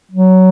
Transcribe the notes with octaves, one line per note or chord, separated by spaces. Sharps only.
F#3